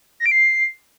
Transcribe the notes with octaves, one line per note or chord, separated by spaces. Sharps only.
A#6
D7
C7